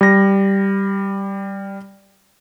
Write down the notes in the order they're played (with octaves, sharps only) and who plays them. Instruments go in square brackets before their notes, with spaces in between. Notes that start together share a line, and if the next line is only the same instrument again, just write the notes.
[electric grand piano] G3 A#6